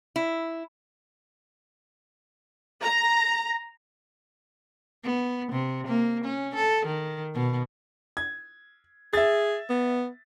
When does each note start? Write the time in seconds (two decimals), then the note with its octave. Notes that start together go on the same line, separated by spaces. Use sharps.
0.16 E4
2.83 A#5
5.04 B3
5.52 C3
5.88 A#3
6.25 C#4
6.56 A4
6.86 D#3
7.35 B2
8.17 G#6
9.13 G#4 E5 A6
9.70 B3